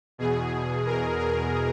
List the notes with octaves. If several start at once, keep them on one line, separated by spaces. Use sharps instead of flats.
E2 B2 G#4
A#4
A#4